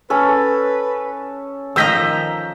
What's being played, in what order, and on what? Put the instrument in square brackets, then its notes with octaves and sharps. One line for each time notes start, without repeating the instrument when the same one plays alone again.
[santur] C#4 A4 [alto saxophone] B4
[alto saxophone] D#3 [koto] F3 D#5 A#5 [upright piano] E6 G6 B6